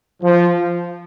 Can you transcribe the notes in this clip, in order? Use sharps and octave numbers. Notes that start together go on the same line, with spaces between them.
F3